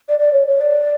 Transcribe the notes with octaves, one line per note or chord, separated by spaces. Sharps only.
D5
D5
C#5
C#5
D5